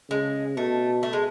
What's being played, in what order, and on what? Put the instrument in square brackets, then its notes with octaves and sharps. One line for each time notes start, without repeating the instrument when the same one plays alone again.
[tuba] C#3 [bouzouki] G#3
[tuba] B2 [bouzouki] A3
[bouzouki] A3
G#3